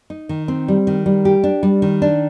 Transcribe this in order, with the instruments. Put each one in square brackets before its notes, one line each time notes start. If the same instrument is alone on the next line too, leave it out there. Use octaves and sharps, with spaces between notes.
[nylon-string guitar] D#4
D#3
C4
G3
D#3
G3
G4
D4
G3
D#3
D4